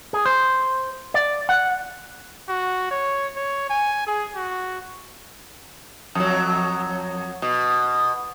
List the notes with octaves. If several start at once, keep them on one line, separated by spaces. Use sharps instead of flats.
G#4
C5
D5
F#5
F#4
C#5
C#5
G#5
G#4
F#4
F2 F#3
B2